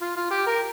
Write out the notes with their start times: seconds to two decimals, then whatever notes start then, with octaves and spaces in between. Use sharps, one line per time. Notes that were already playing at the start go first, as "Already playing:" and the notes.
0.01 F4
0.17 F4
0.30 G4
0.46 A#4